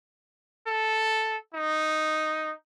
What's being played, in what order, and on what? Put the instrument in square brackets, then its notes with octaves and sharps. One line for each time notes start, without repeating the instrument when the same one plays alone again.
[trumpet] A4
D#4